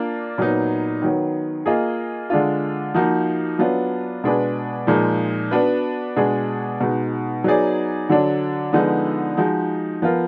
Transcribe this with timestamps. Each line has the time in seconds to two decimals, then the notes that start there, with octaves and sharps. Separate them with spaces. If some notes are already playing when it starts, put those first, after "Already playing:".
Already playing: A#3 D4 F4
0.38 A#2 F#3 B3 D#4
1.02 D#3 F#3 B3
1.66 A#3 F4 G#4 D#5
2.30 D3 G#3 D4 F4
2.94 F3 A#3 D#4 F#4
3.59 F#3 B3 D4 F4
4.24 B2 G#3 D4 G#4 B4
4.87 A#2 F3 G#3 D#4
5.51 B3 D4 F#4 B4
6.16 B2 G#3 D4 G#4
6.80 B2 G#3 D#4
7.44 F#3 B3 D#4 G#4 D5
8.09 D3 F#3 D4
8.73 D3 F3 G#3 B3 D#4
9.37 F3 G#3 D#4 F#4
10.02 F3 B3 F4 A#4